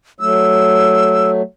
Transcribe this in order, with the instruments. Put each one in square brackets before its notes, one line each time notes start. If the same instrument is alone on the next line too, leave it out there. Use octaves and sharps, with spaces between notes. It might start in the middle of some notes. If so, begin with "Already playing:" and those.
[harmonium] F#3 A3 [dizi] E6